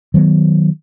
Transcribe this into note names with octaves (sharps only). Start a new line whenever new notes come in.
D#3 F#3 G#3 B3